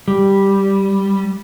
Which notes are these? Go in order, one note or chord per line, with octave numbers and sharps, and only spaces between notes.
G3